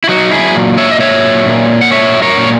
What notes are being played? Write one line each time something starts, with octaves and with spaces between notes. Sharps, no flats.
E4
F#3 D#4 F#4
E4 G#4
A#2
C#5 E5
D#5
F#3 C#5 E5
A#2
F#5
F#3 C#5 E5
A#4 C#5
A#2